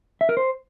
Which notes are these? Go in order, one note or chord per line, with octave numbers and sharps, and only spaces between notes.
E5
A#4
C5